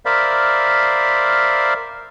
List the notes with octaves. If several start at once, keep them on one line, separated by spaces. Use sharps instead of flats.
A#4 C5 D5 E5 F5 B5